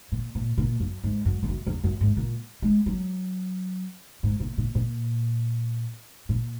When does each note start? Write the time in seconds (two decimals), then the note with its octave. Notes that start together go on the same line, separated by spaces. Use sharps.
0.12 A#2
0.35 A#2
0.58 A#2
0.80 F#2
1.04 G#2
1.25 F#2
1.43 E2
1.48 F#2
1.67 E2
1.84 F#2
2.01 G#2
2.17 A#2
2.62 G#3
2.86 F#3
4.23 G#2
4.40 A#2
4.58 A#2
4.75 A#2
6.29 A#2